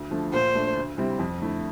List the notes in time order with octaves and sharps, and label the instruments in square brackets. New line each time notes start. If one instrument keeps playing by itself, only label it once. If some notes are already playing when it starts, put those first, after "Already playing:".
Already playing: [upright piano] D2
D3 F3 A3
[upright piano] A#2 [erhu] C5
[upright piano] A3 D4
D2
C3 G3 C4 E4
F2
D3 A3 E4